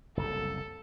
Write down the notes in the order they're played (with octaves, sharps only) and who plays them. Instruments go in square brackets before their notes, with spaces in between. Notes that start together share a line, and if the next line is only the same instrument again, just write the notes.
[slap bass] F#1 C2 F#2 [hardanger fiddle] A4